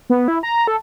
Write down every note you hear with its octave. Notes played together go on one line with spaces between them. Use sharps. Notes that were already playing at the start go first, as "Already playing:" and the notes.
B3
E4
A#5
A4